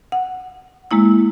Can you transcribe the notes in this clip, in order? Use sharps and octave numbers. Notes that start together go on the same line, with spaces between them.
F#5
G#3 A#3 E4 E6